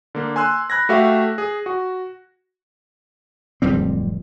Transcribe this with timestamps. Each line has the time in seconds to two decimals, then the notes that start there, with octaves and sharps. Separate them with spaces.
0.15 D3 A#3
0.36 G#5 C6 E6 F#6
0.70 B5 F#6 G#6 A#6
0.89 A3 F#4 G4 E5 F5
1.38 G#4
1.66 F#4
3.62 D1 F2 G3 C4